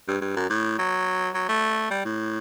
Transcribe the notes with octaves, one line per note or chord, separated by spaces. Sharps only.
G2
G2
F#2
A2
F#3
F#3
A3
G3
A2